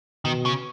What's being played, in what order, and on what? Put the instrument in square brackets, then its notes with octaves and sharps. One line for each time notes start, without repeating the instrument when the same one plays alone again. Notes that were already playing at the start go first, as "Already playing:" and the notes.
[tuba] B2 [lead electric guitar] D#3
[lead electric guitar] C#3